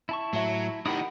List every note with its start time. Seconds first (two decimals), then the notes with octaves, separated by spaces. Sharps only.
0.09 E4 A5 C#6
0.33 A2 F#3 E5
0.86 A2 D#3 D#4 G4 F#5 B5 D#6